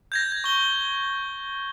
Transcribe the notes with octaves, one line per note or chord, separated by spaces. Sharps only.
G6 G#6 A#6
G#6
C#6 G7